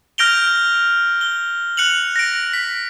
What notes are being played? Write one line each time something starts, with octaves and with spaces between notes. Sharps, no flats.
F6 G6 A#6 D7 F7 G7
G7
F#6 C#7 F7 F#7
A#6 D7
B6